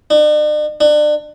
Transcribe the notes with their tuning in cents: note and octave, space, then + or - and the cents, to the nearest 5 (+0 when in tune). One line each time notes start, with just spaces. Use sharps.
D4 +45
D4 +30